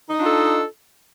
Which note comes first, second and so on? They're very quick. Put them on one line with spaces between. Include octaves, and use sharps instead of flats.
D#4 D#5 D4 F4 A4